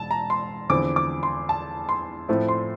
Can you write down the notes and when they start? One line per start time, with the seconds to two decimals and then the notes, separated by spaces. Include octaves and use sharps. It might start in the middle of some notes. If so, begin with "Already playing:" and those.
Already playing: E1 A5
0.11 A#5
0.30 C6
0.69 E2 D3 F3 C4 D6
0.96 D6
1.23 C6
1.49 A5
1.89 C6
2.28 A2 F3 A3 C4 E4
2.48 C6